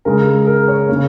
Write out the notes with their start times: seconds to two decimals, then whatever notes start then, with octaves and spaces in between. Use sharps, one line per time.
0.05 C#3 G#3 A#4
0.47 A#4
0.68 C#5
0.88 C#3 A#3